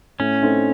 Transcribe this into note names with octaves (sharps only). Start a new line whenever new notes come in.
A2 C#4
A3 C4 D#4